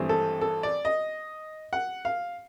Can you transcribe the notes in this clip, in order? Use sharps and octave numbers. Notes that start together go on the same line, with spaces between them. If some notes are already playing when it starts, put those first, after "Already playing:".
Already playing: G#1 G2 E3 A3 C4
A4
A4
D5
D#5
F#5
F5